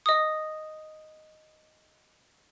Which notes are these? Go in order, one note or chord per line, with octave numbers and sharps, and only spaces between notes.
D#5 D#6